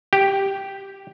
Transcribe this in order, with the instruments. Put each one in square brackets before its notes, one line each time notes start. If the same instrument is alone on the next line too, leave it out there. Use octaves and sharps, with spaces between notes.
[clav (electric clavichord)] G4